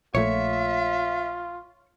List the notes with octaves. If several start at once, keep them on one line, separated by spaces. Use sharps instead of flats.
A#1 A#2 A3 F4 C#5 E5